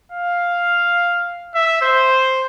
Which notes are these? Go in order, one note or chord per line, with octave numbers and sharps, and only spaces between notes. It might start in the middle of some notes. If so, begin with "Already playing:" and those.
F5
E5
C5